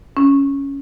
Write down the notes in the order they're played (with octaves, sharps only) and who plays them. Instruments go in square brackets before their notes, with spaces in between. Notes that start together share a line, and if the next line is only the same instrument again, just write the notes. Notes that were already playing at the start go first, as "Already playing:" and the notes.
[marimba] C#4